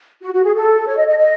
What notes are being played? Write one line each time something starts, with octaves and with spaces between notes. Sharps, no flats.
F#4
F#4
G#4
A4
C#5
D#5
D#5
D#5